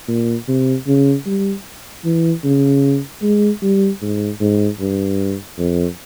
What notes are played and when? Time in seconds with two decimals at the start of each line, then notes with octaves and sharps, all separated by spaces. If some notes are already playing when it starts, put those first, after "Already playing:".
0.08 A#2
0.48 C3
0.87 C#3
1.26 G3
2.05 E3
2.44 C#3
3.22 G#3
3.62 G3
4.02 G#2
4.41 G#2
4.80 G2
5.59 F2